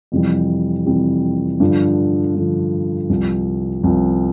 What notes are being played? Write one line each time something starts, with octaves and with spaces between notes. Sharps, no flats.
F2 C3 E3 G3
F2 C3 E3 G3
G2 D3 F3
G2 D3 F3
C2 C3 F3
C2 C3 F3